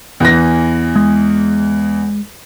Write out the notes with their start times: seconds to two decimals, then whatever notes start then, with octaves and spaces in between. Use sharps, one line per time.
0.20 E2 E3 A#6
0.96 G#3